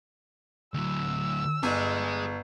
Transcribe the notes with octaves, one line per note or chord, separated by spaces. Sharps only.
D2 F#3 E6
G1 G#4 D#5